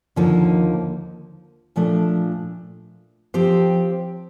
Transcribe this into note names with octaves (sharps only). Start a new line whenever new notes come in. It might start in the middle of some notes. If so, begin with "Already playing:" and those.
D#2 D3 F3 A#3 D#4
A#2 F3 A3 D4
F3 C4 G4 C5